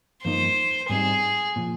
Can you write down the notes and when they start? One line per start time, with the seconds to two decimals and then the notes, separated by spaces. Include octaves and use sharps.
0.24 G2 F3 A#3 D#4 C5
0.89 G#2 G3 C4 D#4 G#4
1.56 A#2 F3